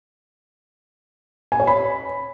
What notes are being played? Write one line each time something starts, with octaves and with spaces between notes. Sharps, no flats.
G#5
C#5
B5